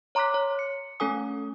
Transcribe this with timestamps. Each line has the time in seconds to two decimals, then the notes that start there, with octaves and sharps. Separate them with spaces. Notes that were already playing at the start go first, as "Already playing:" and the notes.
0.15 C#5 A#5 C6 D6 F#6 B6
0.34 C#5
0.59 C#7
1.00 A3 C#4 A4 G#5 D#6